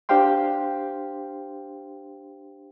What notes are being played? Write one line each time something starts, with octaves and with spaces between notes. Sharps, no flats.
D4 G4 C5 F5 G5 C6